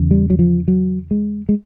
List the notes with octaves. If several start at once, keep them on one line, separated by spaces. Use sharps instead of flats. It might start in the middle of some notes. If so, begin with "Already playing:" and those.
Already playing: E2 C#3
G3
F#3
F3
F#3
G#3
G#3